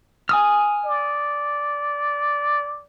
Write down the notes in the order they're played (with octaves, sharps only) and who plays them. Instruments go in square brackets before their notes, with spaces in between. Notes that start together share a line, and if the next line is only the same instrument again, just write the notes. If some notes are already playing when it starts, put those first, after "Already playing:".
[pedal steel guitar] G#5 D#6 F6
[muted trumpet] D5